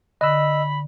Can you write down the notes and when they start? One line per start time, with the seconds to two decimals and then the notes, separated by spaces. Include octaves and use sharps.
0.21 D3 D#5 B5 E6